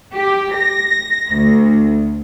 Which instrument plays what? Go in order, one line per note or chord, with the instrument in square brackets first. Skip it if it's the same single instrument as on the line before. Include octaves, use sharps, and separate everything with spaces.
[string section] G4
A#6
D2